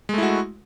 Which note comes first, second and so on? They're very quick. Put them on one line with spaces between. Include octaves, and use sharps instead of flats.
G#3 A3 E4 F#4